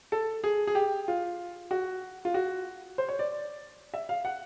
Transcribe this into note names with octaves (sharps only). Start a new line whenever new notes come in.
A4
G#4
G#4
G4
F4
F#4
F4
F#4
C5
C#5
D5
E5
F5
F#5